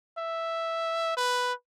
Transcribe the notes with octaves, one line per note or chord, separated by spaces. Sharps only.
E5
B4